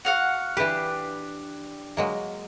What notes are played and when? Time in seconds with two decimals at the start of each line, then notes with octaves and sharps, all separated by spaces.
0.05 F#4 F5 F#5
0.57 E3 D4 G4 B4
1.97 F#3 G#3 A#3